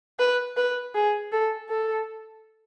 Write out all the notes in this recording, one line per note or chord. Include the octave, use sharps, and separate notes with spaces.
B4
B4
G#4
A4
A4